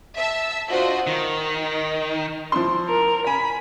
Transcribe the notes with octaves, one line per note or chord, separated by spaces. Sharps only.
E5 A5 E6
D4 F4 F#4 C5 D#5
D#3
F3 E4 C6
A#4
G#5 B5